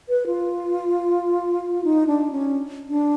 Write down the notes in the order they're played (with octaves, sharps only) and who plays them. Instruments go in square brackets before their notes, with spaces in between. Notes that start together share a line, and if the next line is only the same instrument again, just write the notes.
[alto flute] B4
F4
D#4
D4
C#4
D4